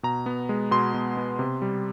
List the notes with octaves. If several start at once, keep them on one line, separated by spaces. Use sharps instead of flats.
B2 A#5
B3
G#3
B2 C6
B2
B3
C3
G3